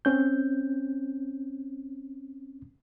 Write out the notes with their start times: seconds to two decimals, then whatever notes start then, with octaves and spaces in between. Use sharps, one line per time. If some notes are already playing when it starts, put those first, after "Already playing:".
0.05 C4 C#4 G6